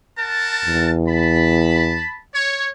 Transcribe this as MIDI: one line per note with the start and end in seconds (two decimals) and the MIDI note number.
0.17 0.93 70
0.17 0.93 78
0.17 0.93 81
0.65 2.04 40
1.08 2.19 81
1.08 2.19 83
2.34 2.69 73